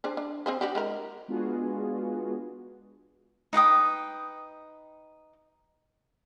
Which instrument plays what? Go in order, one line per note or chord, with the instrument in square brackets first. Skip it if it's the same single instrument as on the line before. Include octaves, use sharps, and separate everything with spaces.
[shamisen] D4 G#4 C5
D4
C4 G#4 C5
D4 F#4 G4
G#3 E4 A#4
[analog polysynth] G#3 B3 D4 F4 F#4 G#4
[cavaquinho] D#4 B4 G5 D#6